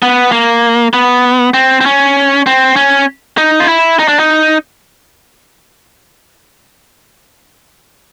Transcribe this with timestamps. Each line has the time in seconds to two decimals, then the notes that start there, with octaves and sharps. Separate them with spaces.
0.02 B3
0.32 A#3
0.93 B3
1.54 C4
1.81 C4
1.86 C#4
2.46 C4
2.76 C#4
3.38 D#4
3.60 F4
3.68 E4
3.99 D#4
4.08 D4
4.19 D#4